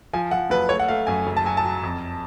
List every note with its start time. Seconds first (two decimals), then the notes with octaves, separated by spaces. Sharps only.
0.13 F3 G#5
0.31 F3 F#5
0.50 F#1 B4
0.69 A3 C#5
0.80 F#5
0.88 A3 F5
1.07 F#2 G#5
1.27 F#1
1.37 A5
1.44 F#3 G#5
1.57 A5
1.65 F#3
1.83 F2